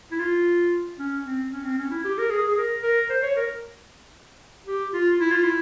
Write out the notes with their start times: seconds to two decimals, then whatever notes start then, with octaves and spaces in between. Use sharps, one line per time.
0.12 E4
0.20 F4
0.99 C#4
1.25 C4
1.52 C#4
1.65 C4
1.78 C#4
1.91 E4
2.05 G4
2.18 A#4
2.31 G#4
2.48 G#4
2.57 A#4
2.83 A#4
3.10 C5
3.23 C#5
3.36 A#4
4.67 G4
4.93 F4
5.20 E4
5.32 F4
5.44 E4